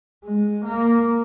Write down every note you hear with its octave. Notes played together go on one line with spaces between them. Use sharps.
G#3
A#3